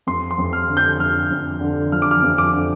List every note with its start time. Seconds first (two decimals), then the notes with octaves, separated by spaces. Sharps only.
0.07 F2 C6
0.31 C6
0.38 F2
0.53 F6
0.68 D3
0.77 G6
0.99 F2 F6
1.31 F2
1.61 D3
1.92 F3 F6
2.02 D6
2.11 F6
2.23 F2
2.38 D6
2.53 D3